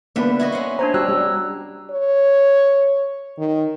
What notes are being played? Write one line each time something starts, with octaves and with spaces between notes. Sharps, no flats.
D3 G3 A#3 B3 B4 E5
E4 F#4 D#5
C#4 F#5 C6
D4 C5 C#5 A#5
G3 F#4 G4 A#5 E6 F#6
G3
C#5
D#3